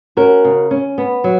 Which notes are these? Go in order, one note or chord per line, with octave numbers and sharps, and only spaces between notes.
C#4 F#4 A#4
C#3
C#4
B3
F#3